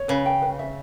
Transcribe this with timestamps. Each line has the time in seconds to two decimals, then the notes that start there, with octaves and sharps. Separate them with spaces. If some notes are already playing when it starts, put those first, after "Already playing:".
Already playing: C#5
0.08 C#3 B4
0.26 G5
0.42 B4
0.59 E5